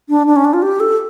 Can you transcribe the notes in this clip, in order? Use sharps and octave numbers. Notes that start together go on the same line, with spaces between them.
D4
D4
C#4
D4
F4
G4
A4